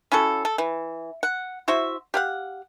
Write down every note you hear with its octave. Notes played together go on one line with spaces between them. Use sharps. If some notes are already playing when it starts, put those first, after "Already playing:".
C#4 E4 F#4 A4
A4
E3
F#5
E4 F#4 C5 E5
G4 F5 F#5